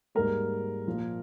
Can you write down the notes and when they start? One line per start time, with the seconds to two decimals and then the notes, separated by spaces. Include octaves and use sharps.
0.15 G#2 G3 A#3 A#4
0.87 A#2 F3 A#3